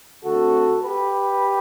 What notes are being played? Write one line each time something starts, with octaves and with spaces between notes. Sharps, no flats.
D3 A3 C4 F#4 A4
G4 B4